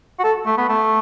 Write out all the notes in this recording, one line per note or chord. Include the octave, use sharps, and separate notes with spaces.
F#4
A4
A3
B3
A3